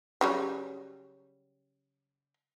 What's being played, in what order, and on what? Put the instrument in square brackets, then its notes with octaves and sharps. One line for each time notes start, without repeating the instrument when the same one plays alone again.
[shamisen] C#3 F#3 G3